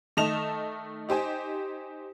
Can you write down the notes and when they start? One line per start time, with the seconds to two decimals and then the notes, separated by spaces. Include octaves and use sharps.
0.17 D#3 A3 D#5 A5 E7 F7
1.09 D#4 G4 C5 G#5